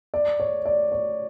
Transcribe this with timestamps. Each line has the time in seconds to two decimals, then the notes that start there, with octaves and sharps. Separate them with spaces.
0.14 D5
0.40 C#5
0.65 D5
0.92 C#5